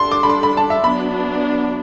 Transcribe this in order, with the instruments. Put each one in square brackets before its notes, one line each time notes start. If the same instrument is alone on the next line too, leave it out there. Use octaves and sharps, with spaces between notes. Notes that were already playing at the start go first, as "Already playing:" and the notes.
Already playing: [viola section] G3 D4 A4 [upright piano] C6
[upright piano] D6
B5
C6
B5
A5
E5
[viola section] F#3 B3 D4 [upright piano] B5